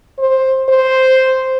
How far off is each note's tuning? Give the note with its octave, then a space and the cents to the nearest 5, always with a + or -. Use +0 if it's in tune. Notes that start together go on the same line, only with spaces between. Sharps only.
C5 +10
C5 +0